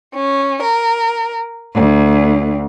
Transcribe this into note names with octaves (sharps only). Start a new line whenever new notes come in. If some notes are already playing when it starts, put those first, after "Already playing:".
C#4
A#4
D2